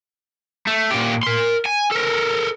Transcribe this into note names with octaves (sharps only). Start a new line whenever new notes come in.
A3
A#2 G4
A#4 C6
G#5
A4 A#4